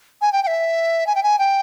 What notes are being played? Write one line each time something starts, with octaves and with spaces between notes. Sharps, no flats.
G#5
G5
G5
E5
G#5
G5
G#5
G5